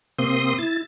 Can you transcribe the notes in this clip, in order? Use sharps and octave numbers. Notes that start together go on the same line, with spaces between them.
C3 A#3 C4 C6 D#6
E4 A6